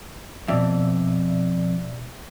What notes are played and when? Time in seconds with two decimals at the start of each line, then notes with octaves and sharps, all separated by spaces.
0.48 F2 B2 D5 E5